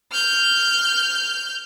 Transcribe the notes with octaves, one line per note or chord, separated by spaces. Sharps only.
F6 G6